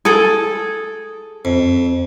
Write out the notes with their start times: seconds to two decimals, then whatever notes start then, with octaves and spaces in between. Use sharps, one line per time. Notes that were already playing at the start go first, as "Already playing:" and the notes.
0.05 G#4 A4
1.45 F2